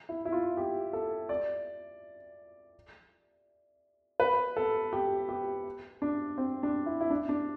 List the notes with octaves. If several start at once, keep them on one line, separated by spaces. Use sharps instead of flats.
E4
E4
F4
G4
A4
D5
B4
A4
G4
G4
D4
C4
D4
E4
E4
D4
D4